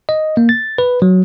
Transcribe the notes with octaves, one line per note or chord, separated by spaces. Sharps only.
D#5
A#3
A6
B4
F#3